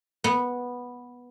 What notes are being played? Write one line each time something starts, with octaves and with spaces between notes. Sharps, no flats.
B3